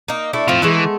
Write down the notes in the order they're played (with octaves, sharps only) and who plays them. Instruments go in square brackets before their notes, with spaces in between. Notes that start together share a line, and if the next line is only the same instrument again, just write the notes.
[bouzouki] A#3 D#4
A3 D4 E4
[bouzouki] A2 F3 [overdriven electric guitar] C4 F4
[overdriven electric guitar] E3 [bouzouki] G#3 A3 B3